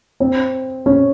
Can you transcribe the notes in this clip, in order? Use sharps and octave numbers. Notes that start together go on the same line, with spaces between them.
C4
C#4